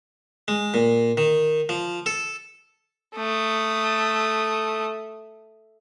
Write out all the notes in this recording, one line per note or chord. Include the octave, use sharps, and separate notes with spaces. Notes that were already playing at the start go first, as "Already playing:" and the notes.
G#3
A#2
D#3
F3
A4
A3 D#6